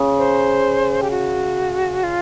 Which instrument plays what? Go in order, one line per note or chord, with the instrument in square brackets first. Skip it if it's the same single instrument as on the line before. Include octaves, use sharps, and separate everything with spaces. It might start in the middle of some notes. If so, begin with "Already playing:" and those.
Already playing: [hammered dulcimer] C#3
[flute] C5
G4
F#4
F4